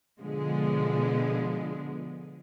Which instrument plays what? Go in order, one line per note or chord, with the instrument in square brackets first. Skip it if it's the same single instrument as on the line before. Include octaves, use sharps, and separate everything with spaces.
[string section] B2 D3 F3 G#3